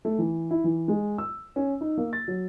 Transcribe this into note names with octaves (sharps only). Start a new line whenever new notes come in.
A3
E3
E4
E3
G#3
E6
C#4
D#4
A#3
A6
F#3